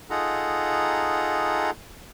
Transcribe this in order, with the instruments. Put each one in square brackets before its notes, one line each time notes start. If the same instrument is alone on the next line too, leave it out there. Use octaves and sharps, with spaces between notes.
[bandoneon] D#4 F4 G#4 A4 F#5 A#5